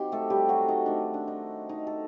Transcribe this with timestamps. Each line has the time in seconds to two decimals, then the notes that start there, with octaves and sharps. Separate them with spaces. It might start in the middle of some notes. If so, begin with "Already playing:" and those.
Already playing: F#3 C4 D#4 G4
0.12 A3 A4
0.30 G3 G4
0.49 F#3 F#4
0.68 D#4
0.86 D#3 A3 C4 D4
1.14 D4
1.28 D#4
1.69 D#4
1.87 A4